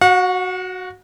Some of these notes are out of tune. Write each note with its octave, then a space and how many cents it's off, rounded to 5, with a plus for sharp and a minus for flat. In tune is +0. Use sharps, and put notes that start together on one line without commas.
F#4 +0 F#5 -40